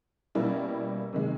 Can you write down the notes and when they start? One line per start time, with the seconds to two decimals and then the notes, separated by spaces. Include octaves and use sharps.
0.35 B2 G3 A#3 C#4 E4
1.13 C3 D#3 G#3